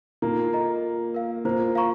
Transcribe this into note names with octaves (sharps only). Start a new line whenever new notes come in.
A#2 A#3 D#4
A4 D#5 A#5
F4
A#4 F5
A#2 A#3 C5
F5 A#5 C#6